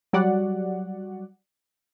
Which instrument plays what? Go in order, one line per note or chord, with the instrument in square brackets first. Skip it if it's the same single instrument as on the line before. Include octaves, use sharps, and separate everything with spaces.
[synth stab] F#3 G3 F#4 D5 F#5